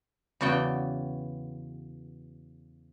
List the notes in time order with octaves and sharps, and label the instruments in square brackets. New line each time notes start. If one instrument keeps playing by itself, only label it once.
[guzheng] E2 C#3 F#4 D5 G5